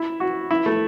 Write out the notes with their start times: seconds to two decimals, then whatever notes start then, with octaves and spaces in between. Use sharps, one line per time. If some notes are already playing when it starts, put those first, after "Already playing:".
Already playing: E4
0.20 F#4
0.51 E4
0.66 A3